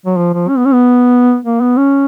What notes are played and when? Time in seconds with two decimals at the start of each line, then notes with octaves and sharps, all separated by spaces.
0.06 F#3
0.17 F3
0.33 F3
0.48 C#4
0.57 B3
0.66 C#4
0.73 B3
1.45 A#3
1.61 B3
1.77 C#4